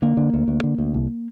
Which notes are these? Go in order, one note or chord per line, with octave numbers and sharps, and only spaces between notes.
D3 A#3
D3
D2
D2
D3
D2
C2